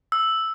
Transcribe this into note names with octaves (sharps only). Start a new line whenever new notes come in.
E6